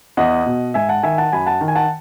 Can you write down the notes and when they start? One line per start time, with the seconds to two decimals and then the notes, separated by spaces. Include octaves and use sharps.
0.17 E2 D#5 F#5
0.46 B2
0.74 G#2 E5 G#5
0.89 F#5 A5
1.03 D#3 E5 G#5
1.18 F#5 A5
1.32 F#2 G#5 B5
1.46 F#5 A5
1.61 D#3
1.68 G#5
1.76 F#5 A5